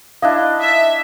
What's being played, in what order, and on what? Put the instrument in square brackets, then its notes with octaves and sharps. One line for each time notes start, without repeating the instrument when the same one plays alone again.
[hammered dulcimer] D4 E4 D#5 [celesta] F5
[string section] E5